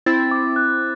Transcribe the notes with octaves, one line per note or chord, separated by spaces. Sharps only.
C4 E4 A6
D6
F#6